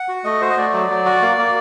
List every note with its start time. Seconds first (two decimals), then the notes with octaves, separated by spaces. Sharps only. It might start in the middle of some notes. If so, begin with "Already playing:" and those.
Already playing: F#5
0.08 F#4
0.24 A3 D#5
0.41 F#4 C5
0.50 D#5
0.57 A3 D5
0.73 F#3
0.90 F#3
1.06 F#4
1.22 A#3
1.38 A#3